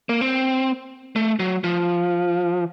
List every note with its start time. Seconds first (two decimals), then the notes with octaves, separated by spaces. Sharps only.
0.09 A#3
0.21 C4
1.16 A3
1.39 F#3
1.64 F3